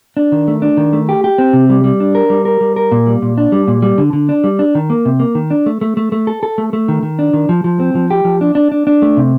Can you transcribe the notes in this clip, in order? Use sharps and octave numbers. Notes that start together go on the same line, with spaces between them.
D4
D#3
A3
D4
D#3
A3
G4
G4
C4
C3
G3
G3
D4
A#4
G3
A#4
G3
A#4
A#2
G3
A#2
D4
G3
A#2
G3
D3
D3
D4
G3
D4
D#3
A#3
C3
A#3
D#3
D4
A3
A3
A3
A3
A4
A4
A3
A3
D#3
D#3
D4
D#3
F3
F3
C4
F3
G4
F3
D4
D4
D4
D4
A3
C3